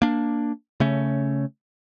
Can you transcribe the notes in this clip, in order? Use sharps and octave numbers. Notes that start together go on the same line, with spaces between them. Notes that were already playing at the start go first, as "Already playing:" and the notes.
A#3 D4
C#3 A3 C#4